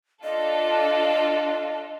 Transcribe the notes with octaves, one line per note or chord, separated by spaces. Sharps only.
D4 F4 A4 D#5